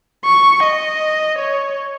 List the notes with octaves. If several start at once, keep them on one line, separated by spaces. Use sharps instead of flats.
C#6
D#5
C#5